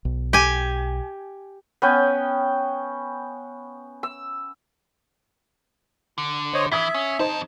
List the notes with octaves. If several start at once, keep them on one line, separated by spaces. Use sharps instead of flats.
B1
G4 G#5
B3 C#4 G5
E6
D3
C5 C#5 D#5
E3 E5 D#6 G#6 B6
C#4
F2 D#4 C5 A5